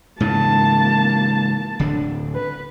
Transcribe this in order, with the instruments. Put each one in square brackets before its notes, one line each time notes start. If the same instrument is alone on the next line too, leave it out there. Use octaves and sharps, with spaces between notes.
[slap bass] G#2 C#3 E3 [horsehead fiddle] A#3 A5
[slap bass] D1 D3 D4
[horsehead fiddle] B4